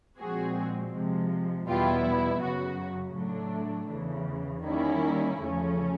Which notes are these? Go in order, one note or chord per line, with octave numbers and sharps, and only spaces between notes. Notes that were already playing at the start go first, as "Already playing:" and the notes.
A#2 F3 G#3 C4 F#4 G#4
C3 F3 G#3
E2 B2 G3 B3 E4 F4 G4
F#2 C#3 F#3 F#4
A2 F#3 A3 D4
E2 C#3 E3
D#3 G3 A#3 C#4 E4
E2 C#3 F3 A3 C#4